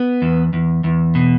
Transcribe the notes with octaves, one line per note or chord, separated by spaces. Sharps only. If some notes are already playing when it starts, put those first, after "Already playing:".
Already playing: B3
E2
E2
E2
B2